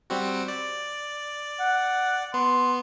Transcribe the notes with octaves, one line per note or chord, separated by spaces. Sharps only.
G3 C4 F#4
D5
F#5
B3 C6